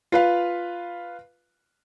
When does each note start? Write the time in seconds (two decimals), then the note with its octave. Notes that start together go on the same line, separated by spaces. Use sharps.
0.12 F4 B4 F5